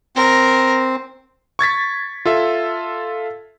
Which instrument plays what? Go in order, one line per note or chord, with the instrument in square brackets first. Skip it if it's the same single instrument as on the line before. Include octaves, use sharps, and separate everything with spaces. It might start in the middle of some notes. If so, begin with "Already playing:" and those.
[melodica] C4 [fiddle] A#4
[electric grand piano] C#6 G#6 A6 B6
F4 A4 E5